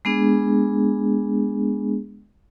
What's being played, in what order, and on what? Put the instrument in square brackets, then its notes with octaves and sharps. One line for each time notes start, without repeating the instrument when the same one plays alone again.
[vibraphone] G#3 B3 D4 G#4